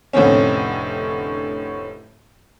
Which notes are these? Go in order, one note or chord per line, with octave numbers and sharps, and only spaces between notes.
F1 A2 D3 C4 C#4